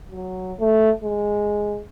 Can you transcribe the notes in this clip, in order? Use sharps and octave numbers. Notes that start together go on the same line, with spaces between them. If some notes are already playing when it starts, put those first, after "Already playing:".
F#3
A3
G#3